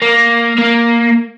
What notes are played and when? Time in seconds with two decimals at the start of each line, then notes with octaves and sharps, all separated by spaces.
0.02 A#3
0.58 A#3